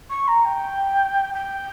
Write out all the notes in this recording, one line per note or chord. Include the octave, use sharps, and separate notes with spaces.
C#6
A#5
G5
G5